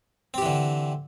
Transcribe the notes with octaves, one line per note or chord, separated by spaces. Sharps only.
D3 E3 C4 G4